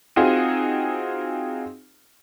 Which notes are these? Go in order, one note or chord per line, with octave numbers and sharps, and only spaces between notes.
C4 D#4 F4 F#4 G#4